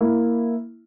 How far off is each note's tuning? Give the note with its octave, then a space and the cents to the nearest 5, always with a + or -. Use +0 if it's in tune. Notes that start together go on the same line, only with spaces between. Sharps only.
A#3 +0 E4 +0